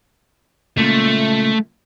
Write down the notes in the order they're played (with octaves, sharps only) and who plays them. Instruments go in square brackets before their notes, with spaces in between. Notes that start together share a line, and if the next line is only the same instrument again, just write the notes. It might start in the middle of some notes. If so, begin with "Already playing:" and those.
[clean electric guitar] C#2 A#2 A#3 [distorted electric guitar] A3